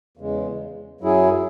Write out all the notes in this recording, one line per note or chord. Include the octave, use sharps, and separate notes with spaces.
E2 C#3 G#3
F#2 F#3 E4 G#4